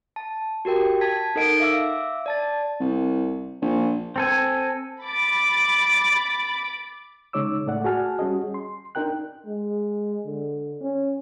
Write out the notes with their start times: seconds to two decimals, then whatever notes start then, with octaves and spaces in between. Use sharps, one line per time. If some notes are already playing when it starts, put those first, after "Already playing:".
0.16 A5
0.65 F#4 G4 A#4 G5
1.01 A5 G#6 B6
1.35 D#4 A4 A#4 D#5 F#5 D7
1.60 E5 F5 D6 E6
2.26 D5 A5 A6
2.80 C2
3.61 A#1
4.16 C4 A4 G#5
5.02 B5 D6 A6
7.33 C#3 G#3 D#4 C#5 D6 E6
7.66 A2 A3 D5 F#5
7.84 F#4 G#4 F#5 G#5 A5 F6
8.19 G3 C#4 F#4 G#4 D#5
8.54 C6
8.95 D4 D#4 A#4 G5 F#6
9.46 G#3
10.27 D3
10.82 C#4